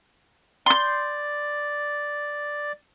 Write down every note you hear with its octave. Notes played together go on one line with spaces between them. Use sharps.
D5 C6 G6